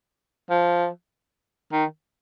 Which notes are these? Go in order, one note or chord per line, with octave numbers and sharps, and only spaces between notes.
F3
D#3